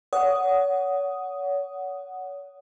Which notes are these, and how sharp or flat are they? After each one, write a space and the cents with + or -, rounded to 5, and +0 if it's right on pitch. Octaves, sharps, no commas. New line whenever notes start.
C#5 +35 F#5 +0 D#6 +0